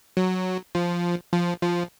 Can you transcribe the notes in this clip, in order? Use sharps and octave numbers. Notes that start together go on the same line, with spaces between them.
F#3
F3
F3
F3